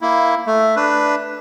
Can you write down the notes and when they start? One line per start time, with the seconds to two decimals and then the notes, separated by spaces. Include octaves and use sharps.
0.01 A#3 E4
0.47 A3
0.76 D4 B4